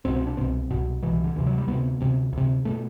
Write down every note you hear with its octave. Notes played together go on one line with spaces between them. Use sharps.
C2 B2 C4
C4
D4
C2 B2 C4
C2 B2
C2 B2 E3
E3
D3
D2 C3 E3
F#3
G3
D2 C3 B3
D2 C3
D2 C3
B2 A3